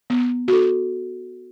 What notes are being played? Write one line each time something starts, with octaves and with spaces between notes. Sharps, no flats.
B3
F#4 A4